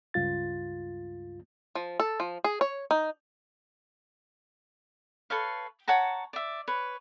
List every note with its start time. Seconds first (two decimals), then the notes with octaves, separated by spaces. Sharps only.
0.14 C#2 G2 F4 A6
1.75 F3
2.00 A4
2.20 F3
2.44 G#4
2.61 C#5
2.91 D#4
5.30 A4 B4 C#5 F5
5.88 C#5 F#5 A5 A#5
6.33 D5 E5
6.68 B4 C#5